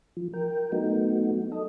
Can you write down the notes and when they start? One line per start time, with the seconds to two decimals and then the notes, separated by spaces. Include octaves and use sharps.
0.17 F3
0.34 A#4 G5
0.72 F#3 A3 B3 D#4 F#4
1.52 A4 D#5